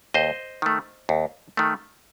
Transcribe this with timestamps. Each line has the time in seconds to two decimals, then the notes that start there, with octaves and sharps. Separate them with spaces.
0.14 D#2 C5 D#5
0.62 D#3 A3
1.09 D#2
1.57 D#3 A3